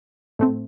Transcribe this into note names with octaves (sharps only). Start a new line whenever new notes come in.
A2 A3 C4